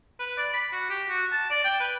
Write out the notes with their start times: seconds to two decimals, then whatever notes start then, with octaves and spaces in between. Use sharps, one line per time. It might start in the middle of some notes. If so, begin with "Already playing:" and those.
0.20 B4
0.37 D5
0.54 B5
0.72 F#4
0.90 G4
1.09 F#4
1.32 A5
1.50 D5
1.65 G5
1.80 B4